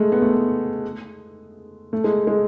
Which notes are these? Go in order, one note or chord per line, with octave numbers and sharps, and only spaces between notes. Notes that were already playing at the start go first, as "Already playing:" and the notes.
Already playing: G#3 A3
B3
A3
B3
A3
G#3
G#3